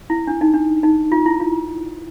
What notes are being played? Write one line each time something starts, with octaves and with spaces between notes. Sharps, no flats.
E4
D4
D#4
D4
D#4
F4
E4
F4